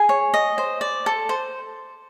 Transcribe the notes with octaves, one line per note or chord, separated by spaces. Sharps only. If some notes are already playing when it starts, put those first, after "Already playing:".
Already playing: G#4 G#5
C#5
D#5
C5
D5
A4
C5